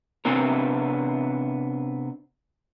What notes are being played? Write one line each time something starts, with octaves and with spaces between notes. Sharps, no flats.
C3 B3 C4 D4 A#4